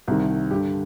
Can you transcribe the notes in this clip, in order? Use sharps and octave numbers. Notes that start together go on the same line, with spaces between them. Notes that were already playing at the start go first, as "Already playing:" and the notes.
C2 C3 D#3
G2 D3 G4